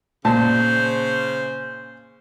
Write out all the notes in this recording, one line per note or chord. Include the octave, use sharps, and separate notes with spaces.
A#2 C#3 C5 A5